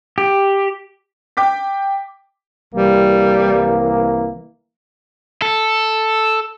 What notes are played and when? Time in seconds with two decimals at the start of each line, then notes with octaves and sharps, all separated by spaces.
0.18 G4
1.37 G5 D6 B6
2.74 C2 E3 G3 A#3
5.42 A4